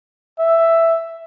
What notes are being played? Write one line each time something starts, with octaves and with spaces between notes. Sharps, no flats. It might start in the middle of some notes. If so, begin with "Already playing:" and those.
E5